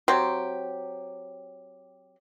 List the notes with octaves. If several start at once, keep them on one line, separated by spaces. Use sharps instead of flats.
F#3 C4 G4